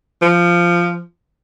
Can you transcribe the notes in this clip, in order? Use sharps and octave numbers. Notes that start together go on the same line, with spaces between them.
F3